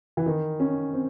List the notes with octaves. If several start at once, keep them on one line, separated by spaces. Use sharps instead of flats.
E3
D#3
C#4
C4